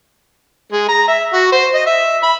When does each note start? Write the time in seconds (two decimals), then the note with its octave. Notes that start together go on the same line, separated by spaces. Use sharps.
0.72 G#3
0.89 A#5
1.08 E5
1.33 F#4
1.52 C5
1.74 D#5
1.86 E5
2.23 B5